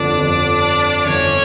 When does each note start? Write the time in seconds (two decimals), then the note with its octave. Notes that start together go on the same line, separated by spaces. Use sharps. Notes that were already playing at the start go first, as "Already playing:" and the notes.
Already playing: G1 F2 D3 D4 D5
0.18 G1 F2 D3
1.04 G1 F2 D3 C#4 C#5